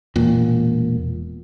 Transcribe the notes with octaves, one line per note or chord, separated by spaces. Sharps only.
E1 A#2